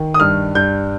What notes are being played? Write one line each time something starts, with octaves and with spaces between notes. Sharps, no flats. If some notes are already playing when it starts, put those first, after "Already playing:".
Already playing: D#3
D#6
G2 F6
G2 G6